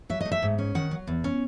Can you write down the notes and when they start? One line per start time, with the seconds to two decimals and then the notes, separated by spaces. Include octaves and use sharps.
0.09 F#3 E5
0.21 A3 D#5
0.32 E5
0.42 G#2
0.58 C#4
0.75 D#3 F#5
0.91 F#3
1.07 E2
1.24 C#4